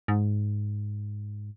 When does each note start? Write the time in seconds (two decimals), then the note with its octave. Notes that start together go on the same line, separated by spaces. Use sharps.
0.08 G#2